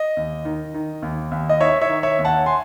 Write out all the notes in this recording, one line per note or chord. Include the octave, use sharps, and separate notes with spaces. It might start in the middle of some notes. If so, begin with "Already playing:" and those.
Already playing: D#5
D#2
D#3
D#3
D#2
D#2
D#5
D#3 C#5 E5
C#5 E5
D#3
C#5 E5
D#2
F#5 A5
G#5 C6